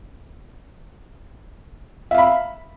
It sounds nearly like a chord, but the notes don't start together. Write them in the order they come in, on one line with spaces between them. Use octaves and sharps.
E5 F5 B5